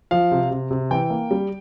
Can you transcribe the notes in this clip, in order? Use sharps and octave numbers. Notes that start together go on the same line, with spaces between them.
F3 F5
C3
C3
C3
E3 G5
A#3
G3